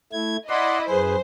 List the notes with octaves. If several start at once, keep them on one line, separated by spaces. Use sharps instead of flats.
A3 E4 G#6
E4 D5 D#5 F#5 C6
F#2 G#4 B4 C5